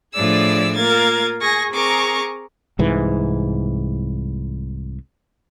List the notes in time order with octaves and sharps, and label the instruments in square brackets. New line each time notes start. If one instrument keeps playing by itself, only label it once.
[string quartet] A2 F3 D4 G#4 D5 E6
A#3 F4 A#4 G#6 A6
G#4 G#5 C#6 A#6
C4 G#4 A#4 A#5 C#6 D6
[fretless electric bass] C2 G#2 E3